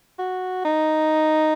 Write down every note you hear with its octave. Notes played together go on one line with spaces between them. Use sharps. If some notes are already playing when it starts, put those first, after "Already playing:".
F#4
D#4